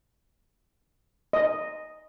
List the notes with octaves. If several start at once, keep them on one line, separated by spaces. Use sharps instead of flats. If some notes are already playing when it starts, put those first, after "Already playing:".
D#5